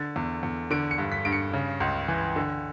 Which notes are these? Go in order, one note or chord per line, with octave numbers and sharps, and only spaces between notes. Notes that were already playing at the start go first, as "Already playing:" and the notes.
Already playing: D3 A6
E2
E2
D3 D7
C#7
G2
B6
G2 D7
C#7
C#3
C#2
E3
D3